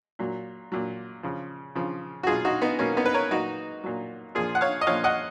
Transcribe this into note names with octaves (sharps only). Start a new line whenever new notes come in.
A#2 F#3
A#2 F#3
C#3 F3
C#3 F3
F#4
B2 F#3 F4 G#4
D#4 F#4
B3 D#4
B2 F#3 A#3 C#4
B3 D#4
B4
A#4 C#5
A#2 F#3 D#4 F#4
A#2 F#3
A#2 F3 F4 G#4
F#5
C#5 F5
D#5
A#2 F3 C#5 F5
D#5 F#5